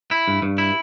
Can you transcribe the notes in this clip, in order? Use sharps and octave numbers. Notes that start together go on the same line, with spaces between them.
E4
G2
G2
E4